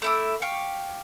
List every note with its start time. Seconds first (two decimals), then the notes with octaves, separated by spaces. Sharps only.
0.02 A3 E4 D6
0.42 G4 F5 C#6